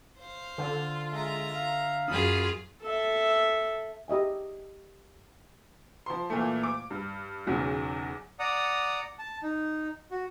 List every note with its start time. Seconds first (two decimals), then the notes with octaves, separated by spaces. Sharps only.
0.17 C5 F5
0.58 D3 F4
1.13 G#3 E5 A#5
1.55 F5
2.08 F#2 F4 G#4 B5 D#6
2.83 A4 E5
4.08 G4 D#5 E5 G#5
6.06 F3 C6
6.30 A#2 E3 A3
6.63 D6
6.91 G2
7.47 B1 E2 C#3 F#3
8.39 D5 F#5 A#5 D#6
9.19 A5
9.42 D#4
10.11 F#4